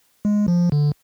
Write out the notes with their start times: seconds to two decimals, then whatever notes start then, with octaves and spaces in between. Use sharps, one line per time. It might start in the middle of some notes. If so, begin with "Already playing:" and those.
0.25 G#3
0.48 F3
0.72 D3